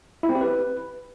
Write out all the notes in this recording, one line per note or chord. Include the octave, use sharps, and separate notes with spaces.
E4
C4
G4
B4